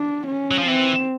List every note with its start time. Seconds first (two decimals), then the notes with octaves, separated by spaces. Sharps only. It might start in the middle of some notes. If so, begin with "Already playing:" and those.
Already playing: D4
0.27 C#4
0.51 F#3
0.58 F3
0.67 E3 C4